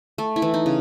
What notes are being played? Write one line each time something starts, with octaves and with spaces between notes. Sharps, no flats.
A3
E4
E3
D#4
C#3